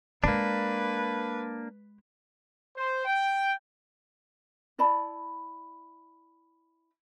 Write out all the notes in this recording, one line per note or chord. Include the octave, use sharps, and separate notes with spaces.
G#3 A#3 D4 B4
C5
G5
E4 D5 A5 B5